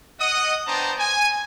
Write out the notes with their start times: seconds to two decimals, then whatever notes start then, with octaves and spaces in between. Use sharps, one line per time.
0.19 D#5 F#5 D#6
0.67 B3 D4 C5 G5 A5 A#5
0.98 G#5